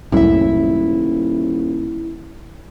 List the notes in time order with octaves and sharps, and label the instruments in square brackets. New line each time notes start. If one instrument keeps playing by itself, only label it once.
[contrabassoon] D#1 [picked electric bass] C2 F#2 A2 [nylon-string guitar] E4 E5